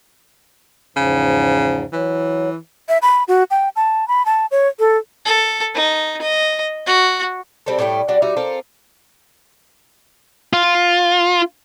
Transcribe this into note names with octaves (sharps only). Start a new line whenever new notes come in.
E2 G#2 C#3 F3
E3 F#3
E5
B5
F#4
G5
A5
B5
A5
C#5
A4
A4
D#4
D#5
F#4
G3 C4 D4 A4
A2 G3 A3 G5
G3 D4 F#4 G4
G3 D#4 F#4 E5
C4 F4 A4 A#4
F4